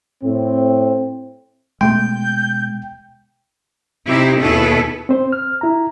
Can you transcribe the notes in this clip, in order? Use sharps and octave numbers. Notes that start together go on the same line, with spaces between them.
A2 C4
B2 G#3 A3 G5 C6 G6
C3 C4 D#4 E4 G4
D#2 B2 E4 G#4 A4 B4
C4 C5
F6
E4 A#5